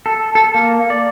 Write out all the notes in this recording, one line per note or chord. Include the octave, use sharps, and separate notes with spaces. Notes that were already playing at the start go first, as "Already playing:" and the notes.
A4
A4
A#3
D5